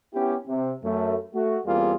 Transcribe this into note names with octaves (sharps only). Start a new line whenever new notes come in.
B3 C#4 E4 G4
C3
F#2 A3
A3 F#4
E2 G3 A#3 C4 F4 G#4